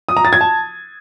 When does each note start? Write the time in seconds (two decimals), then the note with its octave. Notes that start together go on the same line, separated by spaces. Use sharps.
0.09 D#6
0.17 A#5
0.25 A6
0.33 G#6
0.41 A5